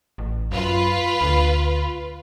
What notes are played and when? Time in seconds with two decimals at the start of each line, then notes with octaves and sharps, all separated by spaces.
0.18 A1
0.51 F#2 F4 B4
1.21 D2